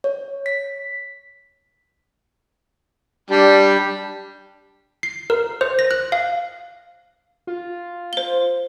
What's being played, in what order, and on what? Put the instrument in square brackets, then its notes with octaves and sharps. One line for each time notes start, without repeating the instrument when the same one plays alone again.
[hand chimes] C#5
B6
[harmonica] G3 [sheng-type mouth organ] D4 G4
[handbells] C7
A#4
C5
A#6
F#6
F5
[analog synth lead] F4
[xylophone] C5 G7